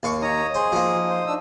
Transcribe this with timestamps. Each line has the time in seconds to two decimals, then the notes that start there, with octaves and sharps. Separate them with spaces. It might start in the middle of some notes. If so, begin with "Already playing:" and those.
0.03 D#2 F5 C#6
0.22 D#4 C#5 A#5 D#6
0.54 G#4 C5
0.72 F3 A#3
1.09 C5
1.27 D4 E6